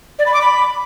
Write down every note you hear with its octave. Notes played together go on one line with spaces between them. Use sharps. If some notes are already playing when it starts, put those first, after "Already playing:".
D5
B5
D6
B5